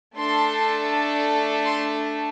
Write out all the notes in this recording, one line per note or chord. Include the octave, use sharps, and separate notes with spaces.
A3 D4 A4 C6
C6